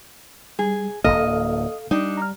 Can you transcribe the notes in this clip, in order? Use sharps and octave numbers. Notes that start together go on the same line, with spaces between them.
G3 G#4
D1 F2 A#3 A4 D#5 F5 F6
G3 D4 D#4
A#5 F6